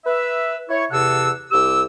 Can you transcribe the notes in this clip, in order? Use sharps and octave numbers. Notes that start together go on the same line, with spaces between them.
B4 E5
E4 C#5
E2 C3 A4 F#5 E6
C2 G4 E6